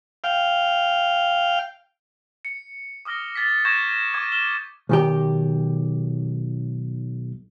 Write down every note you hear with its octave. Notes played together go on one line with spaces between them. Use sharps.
F5 G5
C#7
D6 D#6 F6 A#6 G7
A6 B6
C#6 G6 G#6 A#6 E7
C#6 D6 G#6 D#7
F6 E7 G7
B1 D#3 G4